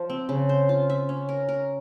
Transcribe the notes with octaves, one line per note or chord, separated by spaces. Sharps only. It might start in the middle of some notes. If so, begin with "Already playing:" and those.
Already playing: F3
C4
C#3
C5
F4
E5
C#4
A#4
A#4